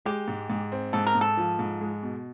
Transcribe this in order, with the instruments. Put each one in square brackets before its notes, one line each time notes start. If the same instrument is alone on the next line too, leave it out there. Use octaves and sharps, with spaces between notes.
[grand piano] G#3 [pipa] G4
[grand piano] G#2
G#2
C4
[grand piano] G#2 [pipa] A4
[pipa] A#4
[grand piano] G#2
[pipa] A4
[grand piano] F3
G#2
G#3
B2